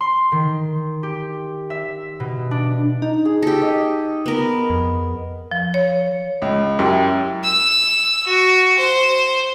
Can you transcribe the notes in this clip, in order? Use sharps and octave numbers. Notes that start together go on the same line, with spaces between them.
C6
D#3
G4
E5
B2
D4
D#4
G#4
G4 A4
D#5 G#5
B3 A#4
F2
F3
C#5
C#2
F#2 E4 G4
E6
F#4
C5